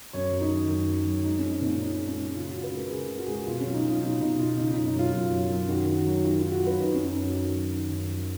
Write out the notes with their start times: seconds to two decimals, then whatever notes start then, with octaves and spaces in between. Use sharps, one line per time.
0.13 F#2 C#5
0.32 F#3
0.41 D#4
0.50 D#3
0.69 F#2
0.88 F#3
1.06 F#3
1.24 G#3 D#4
1.38 F3 C#4
1.52 C#4
1.61 A#2 D#4
1.66 C#4
1.80 F3 D#4
1.94 G#3 D#4
2.08 C#4
2.17 G#3
2.36 C#3 F4
2.50 C#3 F#4
2.63 B4
2.73 G#3 A#4
2.91 C#3 G#4
3.10 G#3
3.19 F#4
3.26 G#3 G#4
3.34 F#4
3.47 B2 F4
3.60 C#4
3.66 F#3
3.74 D#4
3.83 F#3
3.88 F4
4.02 B2 D#4
4.21 B2 D#4
4.39 B2 F4
4.57 C#3 D#4
4.72 F#2 D#4
4.86 D#4
4.95 F#3 F4
5.13 F#2
5.32 F#3
5.50 F#2
5.69 D#3 F#4
5.87 D#3
5.97 F#4
6.06 F#3
6.24 D#3 F4
6.39 D#3 F4
6.52 F#4
6.62 F#3 B4
6.80 F#2 D#4
6.94 F#2 C#4
7.08 D#4
7.17 F#2 F#4
7.35 D#3
7.54 F#3
7.73 D#3
7.91 F#2
8.10 F3